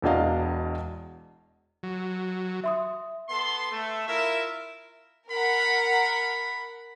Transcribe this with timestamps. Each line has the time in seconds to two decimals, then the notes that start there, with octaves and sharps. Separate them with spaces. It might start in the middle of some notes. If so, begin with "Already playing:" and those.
0.02 E1 E2 B2 D4 D#5 F5
1.83 F#3
2.64 E5 C6 D#6
3.29 B3 A4 C6
3.72 A3
4.08 E4 F4 A#4 E5
5.31 A#4 F#5 B5